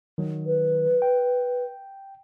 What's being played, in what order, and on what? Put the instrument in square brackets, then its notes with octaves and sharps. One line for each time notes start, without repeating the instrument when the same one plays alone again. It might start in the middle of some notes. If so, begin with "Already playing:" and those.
[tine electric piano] D#3 F#3
[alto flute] B4
[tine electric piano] G5